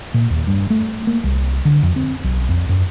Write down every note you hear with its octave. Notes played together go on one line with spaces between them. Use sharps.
A#2
D#2
G2
A3
A#3
C2
D3
F2
C4
B1
F2
F#2